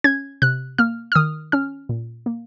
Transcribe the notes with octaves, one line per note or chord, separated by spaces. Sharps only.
C#4 G#6
C3 F#6
A#3 F6
F6
D#3 D#6
C#4 F6
A#2
A#3